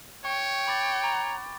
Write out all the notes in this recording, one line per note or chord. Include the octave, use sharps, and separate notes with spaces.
C#5 G5 C#6
B5 D6 A6
A#5